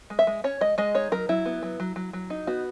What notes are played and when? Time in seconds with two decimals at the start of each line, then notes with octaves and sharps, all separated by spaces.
0.10 G#3
0.19 E5
0.27 G#3
0.44 C#4 C#5
0.61 G#3 D#5
0.78 G#3 D#5
0.95 D#4 C#5
1.12 F#3 A#4
1.29 F#3 E4
1.46 B3
1.63 F#3
1.80 F#3
1.96 F#3
2.13 F#3
2.30 D#4
2.47 B3 F#4